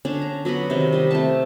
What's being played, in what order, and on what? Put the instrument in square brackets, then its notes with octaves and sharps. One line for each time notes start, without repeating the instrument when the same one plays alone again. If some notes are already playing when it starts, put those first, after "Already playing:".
[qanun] D3 C#4 D4
A#5
F#3 B3 F#4 B4
C3 D#3
G3 D#5
A3 C4 A5